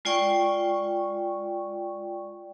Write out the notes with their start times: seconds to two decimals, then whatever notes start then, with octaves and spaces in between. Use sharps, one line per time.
0.05 G#3 F4 D5 G5 C#6